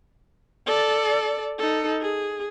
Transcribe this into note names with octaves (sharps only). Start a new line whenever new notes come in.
A4 D5
D#4 A4
G#4